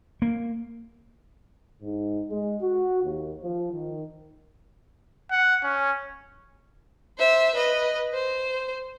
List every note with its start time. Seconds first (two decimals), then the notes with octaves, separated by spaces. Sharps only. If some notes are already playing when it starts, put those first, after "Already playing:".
0.22 A#3
1.82 G#2
2.30 G#3
2.62 F#4
3.03 D#2
3.43 F3
3.73 D#3
5.31 F#5
5.63 C#4
7.18 C5 E5
7.55 B4 D#5
8.13 C5